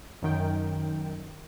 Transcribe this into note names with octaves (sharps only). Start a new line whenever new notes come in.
F#2 D#3 G5